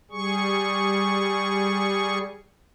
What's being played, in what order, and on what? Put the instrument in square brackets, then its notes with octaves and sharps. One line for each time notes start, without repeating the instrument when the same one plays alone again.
[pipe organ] G3 G#4 C#6